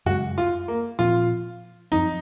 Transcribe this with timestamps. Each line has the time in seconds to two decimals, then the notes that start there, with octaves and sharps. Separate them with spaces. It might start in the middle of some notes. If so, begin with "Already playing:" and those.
0.06 F#2 C#3 G#3 F#4
0.38 F4
0.68 A#3
0.99 A#2 F3 C4 F4
1.92 F#2 F3 C4 D#4